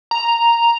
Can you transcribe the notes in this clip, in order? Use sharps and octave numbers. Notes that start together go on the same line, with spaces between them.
A#5